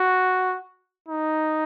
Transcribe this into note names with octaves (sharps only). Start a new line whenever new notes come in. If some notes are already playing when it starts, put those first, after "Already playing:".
Already playing: F#4
D#4